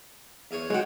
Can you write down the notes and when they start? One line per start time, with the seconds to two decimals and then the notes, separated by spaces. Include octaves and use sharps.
0.51 E2 G#4 C#5
0.70 G#3 F#4 C#5 F#5 G5